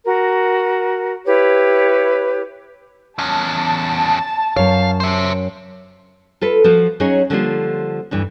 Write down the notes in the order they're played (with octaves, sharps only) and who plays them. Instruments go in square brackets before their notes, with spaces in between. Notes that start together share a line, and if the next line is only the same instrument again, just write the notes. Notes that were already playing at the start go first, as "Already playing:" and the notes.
[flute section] F#4 A#4
E4 G4 B4 C#5
[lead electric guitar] E2 C#4 [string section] A5
[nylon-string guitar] F#2 C#5 [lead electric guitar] F5
[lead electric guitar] C5 E5
[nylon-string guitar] F4 A4 B4
F3 F4 F#4
F#3 C#4 D#4 G#4 C#5
D3 F3 G3 A#3 D4 F4
D2 G2 E3